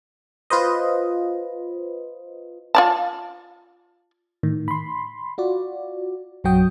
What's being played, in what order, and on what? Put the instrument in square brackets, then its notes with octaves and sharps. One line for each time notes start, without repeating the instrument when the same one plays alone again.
[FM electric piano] F4 B4 C5 D#5
[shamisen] F4 D5 A5
[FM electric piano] A2 D#3
B5 C6
F4 F#4 D5
A#1 F#2 F#3 F#4 G5 D#6